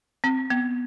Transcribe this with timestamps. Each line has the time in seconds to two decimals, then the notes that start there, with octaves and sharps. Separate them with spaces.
0.24 C4
0.50 B3